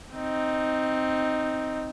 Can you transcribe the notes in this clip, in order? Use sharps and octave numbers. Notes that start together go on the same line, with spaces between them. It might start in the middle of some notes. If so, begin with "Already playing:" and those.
C4 D#4